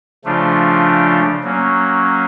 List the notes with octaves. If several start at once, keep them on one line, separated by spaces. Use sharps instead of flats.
C#3 F3 A3 D4 F4
F#3 A#3 C#4